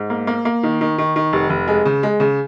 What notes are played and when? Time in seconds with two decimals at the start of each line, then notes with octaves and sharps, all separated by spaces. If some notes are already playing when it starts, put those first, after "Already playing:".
Already playing: G#2
0.10 A#3
0.27 A#3
0.45 A#3
0.63 D#3
0.81 D#3
0.98 D#3
1.16 D#3
1.33 F1
1.50 F1
1.68 G#3
1.85 C#3
2.03 G#3
2.20 C#3